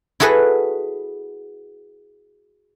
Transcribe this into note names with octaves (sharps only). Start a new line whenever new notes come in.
E4 F#4 G#4 A4 B4